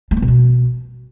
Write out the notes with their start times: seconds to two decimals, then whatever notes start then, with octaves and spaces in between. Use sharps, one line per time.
0.11 G#3
0.17 B3
0.22 C3
0.28 B2